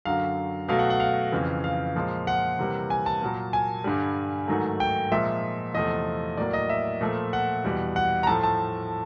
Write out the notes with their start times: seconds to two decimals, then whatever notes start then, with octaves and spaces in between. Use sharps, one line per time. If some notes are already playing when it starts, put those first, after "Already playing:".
0.05 F#2 D3 F#3 F5
0.69 B2 F#3 A3 F5
0.79 F#5
0.90 F#5
1.00 F5
1.32 F2 C#3 E3
1.64 F5
1.96 A#2 F3 G#3
2.27 F#5
2.59 C3 E3 G3 A#3
2.90 G#5
3.06 A5
3.21 A#2 F#3 A#3
3.53 G#5
3.84 G2 D3 G3
4.48 G#2 D#3 F#3 A3
4.80 G5
5.11 A#2 F3 G#3 E5
5.74 E2 C3 F3 A3 D#5
6.37 A2 F#3 A#3 D5
6.53 D#5
6.70 E5
7.01 A#2 F3 A3
7.33 F#5
7.64 E2 B2 G3
7.96 F#5
8.23 A#5
8.27 A2 F3 A3 A5
8.43 A5